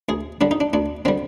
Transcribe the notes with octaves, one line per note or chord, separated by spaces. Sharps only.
D2 G#4
D3 G3 D4
D#4
D4
D2 D4
D3 G3 C4